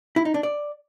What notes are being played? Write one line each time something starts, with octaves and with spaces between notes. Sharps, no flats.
E4
D#4
D4
D5